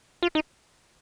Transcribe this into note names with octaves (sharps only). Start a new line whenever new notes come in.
F4
D#4